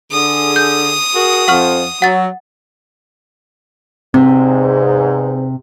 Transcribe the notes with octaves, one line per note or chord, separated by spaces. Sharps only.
D3 G#4 D#6
G6
F#4 G#4 A#4
F2 F3 F#5 C#6 F6
F#3 F#5 A6
E2 G#2 C3 C4